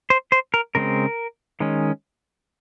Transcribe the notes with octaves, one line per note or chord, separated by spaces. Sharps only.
C5
C5
A#4
C#3 G#3 C4 A#4
D#3 G#3 C#4